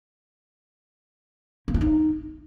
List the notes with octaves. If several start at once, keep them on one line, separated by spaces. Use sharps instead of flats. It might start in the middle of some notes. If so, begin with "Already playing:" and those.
A#3
E4
D#4